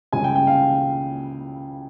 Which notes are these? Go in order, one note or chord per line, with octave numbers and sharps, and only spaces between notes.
C#2 C#3 G3 C#4 G#5
G5
G5
F5